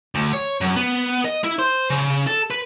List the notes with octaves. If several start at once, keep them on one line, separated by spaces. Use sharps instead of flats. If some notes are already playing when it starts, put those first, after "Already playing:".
D2
C#5
F#2
B3
D#5
E4
C5
C#3
A4
B4